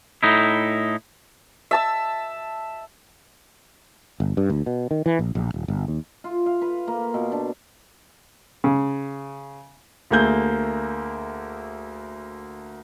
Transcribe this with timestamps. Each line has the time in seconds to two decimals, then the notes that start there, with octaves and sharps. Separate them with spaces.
0.23 A2 D#4 E4
1.71 E5 A5 E6
4.20 G1
4.37 G2
4.50 D2
4.66 B2
4.91 D#3
5.06 E3
5.19 A#1
5.35 A#1
5.54 D#1
5.68 G1
5.88 D#2
6.24 F4
6.46 F5
6.62 B4
6.88 A#3
7.14 B2
7.32 D4
8.64 C#3
10.11 D2 A3 A#3 G#4 G6 G7